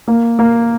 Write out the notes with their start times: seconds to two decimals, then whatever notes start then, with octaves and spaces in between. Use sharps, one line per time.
0.08 A#3
0.39 A#3